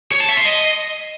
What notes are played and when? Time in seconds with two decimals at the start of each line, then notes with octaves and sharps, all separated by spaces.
0.12 C#5
0.20 A5
0.29 E5
0.37 C6
0.45 D#5